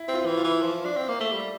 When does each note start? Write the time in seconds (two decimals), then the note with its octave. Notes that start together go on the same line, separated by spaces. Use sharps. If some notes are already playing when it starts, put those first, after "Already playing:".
Already playing: E4
0.08 C4
0.14 F4
0.26 E3
0.37 F4
0.44 E3
0.62 F3
0.85 D4
0.97 C4
1.08 A#3
1.20 A3
1.32 G3